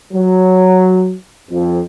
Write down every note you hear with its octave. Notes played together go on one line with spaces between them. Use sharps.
F#3
F2